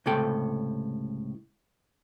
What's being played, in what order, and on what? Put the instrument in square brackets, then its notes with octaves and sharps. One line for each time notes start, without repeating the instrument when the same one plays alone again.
[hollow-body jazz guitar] C#2 A2 C3 A4 G5